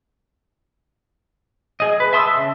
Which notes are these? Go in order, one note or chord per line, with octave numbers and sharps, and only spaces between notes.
G#4 D#5
B4
E5 A5 C6 D#6 E6
C#3